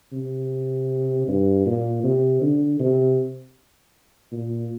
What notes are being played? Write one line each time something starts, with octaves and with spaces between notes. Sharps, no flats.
C3
G2
A#2
C3
D3
C3
A#2